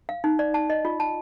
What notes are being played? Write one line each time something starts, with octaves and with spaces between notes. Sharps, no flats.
F5
D#4
D5
A5
D#5
F4
A5